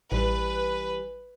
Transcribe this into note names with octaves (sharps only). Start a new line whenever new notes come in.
A1 E3 G3 B4